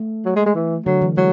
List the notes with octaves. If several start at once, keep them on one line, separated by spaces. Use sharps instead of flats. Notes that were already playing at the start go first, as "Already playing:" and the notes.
Already playing: A3
F#3
G#3
G#3
E3
D3 F#3
E3
F#3 G#3